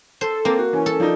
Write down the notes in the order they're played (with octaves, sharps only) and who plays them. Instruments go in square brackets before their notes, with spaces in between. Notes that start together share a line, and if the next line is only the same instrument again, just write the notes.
[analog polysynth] A4 [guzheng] C5
[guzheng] A#3 [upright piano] C4
[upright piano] F#4
[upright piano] E3 [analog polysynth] C#4
[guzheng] A4
[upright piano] F3 D4 D#4